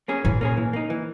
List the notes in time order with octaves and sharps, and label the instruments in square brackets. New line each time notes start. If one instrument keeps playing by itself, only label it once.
[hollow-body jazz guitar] A#3 C#4 G#4
[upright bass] A#2 [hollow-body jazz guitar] E3
[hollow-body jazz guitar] A#3 C#4 G#4
E3
A#3 D#4
E3